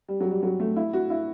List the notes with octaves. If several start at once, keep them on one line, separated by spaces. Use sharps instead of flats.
G3
F#3
G3
F#3
A3
E4
F#4
E4